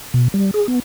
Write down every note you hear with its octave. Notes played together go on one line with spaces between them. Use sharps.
B2
G3
G#4
B3